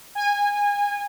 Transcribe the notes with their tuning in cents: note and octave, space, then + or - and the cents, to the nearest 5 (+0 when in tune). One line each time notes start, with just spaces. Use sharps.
G#5 -20